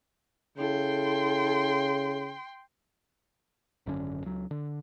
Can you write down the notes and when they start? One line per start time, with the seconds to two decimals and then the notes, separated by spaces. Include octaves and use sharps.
0.58 C#3 E4 A4 G5 C6
3.86 G#1 F#2 D3 C#4
4.24 C#2 F#3
4.51 D3